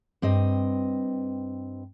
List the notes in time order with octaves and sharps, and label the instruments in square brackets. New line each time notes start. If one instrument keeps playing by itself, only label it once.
[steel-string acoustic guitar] G2 C4 D#5